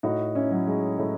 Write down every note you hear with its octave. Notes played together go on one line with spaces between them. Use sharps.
A2 D#4 F#4
C#4 E4
F#3
G#3
A2 A3